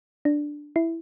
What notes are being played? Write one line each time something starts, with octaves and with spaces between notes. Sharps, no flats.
D4
E4